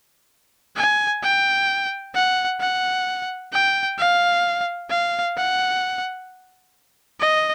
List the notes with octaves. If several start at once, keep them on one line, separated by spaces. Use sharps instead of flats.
G#5
G5
F#5
F#5
G5
F5
F5
F#5
D#5